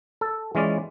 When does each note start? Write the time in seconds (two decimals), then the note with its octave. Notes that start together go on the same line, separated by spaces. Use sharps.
0.21 A4
0.55 E3 G#3 C#4 F4 D5